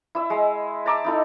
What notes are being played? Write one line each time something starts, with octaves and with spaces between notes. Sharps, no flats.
E4 E6
G#3
A5 A#5 D6 E6
D#4 E4 A4